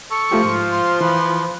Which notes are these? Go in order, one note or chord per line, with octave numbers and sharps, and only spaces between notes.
A4 C#6
F3 A3 F4 G4
G#2 F4
C6
E3 B4 F5